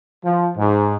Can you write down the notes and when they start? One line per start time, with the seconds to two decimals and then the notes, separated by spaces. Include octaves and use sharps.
0.25 F3
0.57 G#2